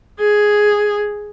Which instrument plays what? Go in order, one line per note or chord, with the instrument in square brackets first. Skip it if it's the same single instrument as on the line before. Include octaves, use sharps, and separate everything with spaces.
[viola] G#4